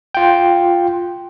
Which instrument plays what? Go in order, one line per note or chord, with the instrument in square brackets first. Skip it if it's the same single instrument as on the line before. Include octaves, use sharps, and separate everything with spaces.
[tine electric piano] F4 G5